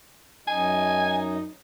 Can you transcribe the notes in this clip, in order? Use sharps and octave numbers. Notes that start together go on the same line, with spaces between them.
F#2 D#4 G#5